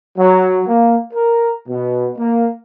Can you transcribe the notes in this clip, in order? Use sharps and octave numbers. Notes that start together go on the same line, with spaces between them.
F#3
A#3
A#4
B2
A#3